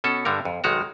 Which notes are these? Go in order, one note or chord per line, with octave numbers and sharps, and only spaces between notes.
B2 C#4 A4
G2 D3 G3 A#4
F2
B1 D#3 G#3 F#4 A#5